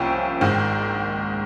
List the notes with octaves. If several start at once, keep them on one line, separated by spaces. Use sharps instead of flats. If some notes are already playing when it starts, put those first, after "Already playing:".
Already playing: C2 C3 F3 A#3 C#4 G5
G#1 G#2 D#3